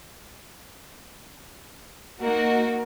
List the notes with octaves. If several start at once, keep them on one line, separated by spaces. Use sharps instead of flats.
A#3 D#4 F#4 A#4